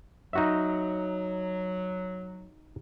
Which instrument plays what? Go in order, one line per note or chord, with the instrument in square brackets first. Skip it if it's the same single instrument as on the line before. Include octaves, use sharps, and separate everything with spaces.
[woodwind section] F#3 [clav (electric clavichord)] D#4 F#4 E5